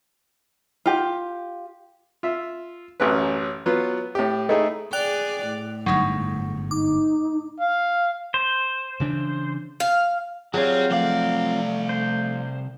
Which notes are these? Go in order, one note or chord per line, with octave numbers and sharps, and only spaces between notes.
F4 G4
F4 E5
A1 F#2 C#4 B4
F#3 B3 F4
A2 G4
A3 D#4 E4 G#4
G#4 D5 G5 F#6 F7
A2
G1 G#2 F#3 D#4
D#4 D6
F5
C5
C#3 E3 D4
F5
F#3 G3 C4 F4 G#4 C#5
C2 F3 A3 D5 F5
C5